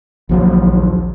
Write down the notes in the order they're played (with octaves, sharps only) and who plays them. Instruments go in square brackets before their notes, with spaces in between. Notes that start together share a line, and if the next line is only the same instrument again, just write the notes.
[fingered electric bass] A#1 D#2 F3 F#3